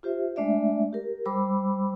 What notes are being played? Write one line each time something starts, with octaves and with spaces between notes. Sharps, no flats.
F4 G4 C5 E5
G#3 A3 D4 D5 E5
G4 A#4
G3 C5 B5 D6 E6